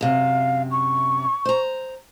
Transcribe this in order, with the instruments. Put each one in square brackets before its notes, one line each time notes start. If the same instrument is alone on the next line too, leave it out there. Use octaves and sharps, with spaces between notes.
[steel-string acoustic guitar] F#2 C3 [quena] F5
[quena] C#6
[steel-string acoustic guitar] C5 A#5